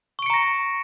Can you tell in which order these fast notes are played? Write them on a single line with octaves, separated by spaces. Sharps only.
C#6 D7 C#7 A#5 A#6